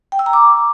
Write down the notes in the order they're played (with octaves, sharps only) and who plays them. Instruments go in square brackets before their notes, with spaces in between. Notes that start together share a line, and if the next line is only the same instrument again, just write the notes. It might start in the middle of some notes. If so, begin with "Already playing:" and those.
[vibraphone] G5
E6
A#5
D6